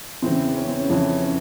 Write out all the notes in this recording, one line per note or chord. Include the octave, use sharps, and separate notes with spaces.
E2 C#3 E3 C4
C#4
C4
C#4
F2 C#3 E3 C#4
C#4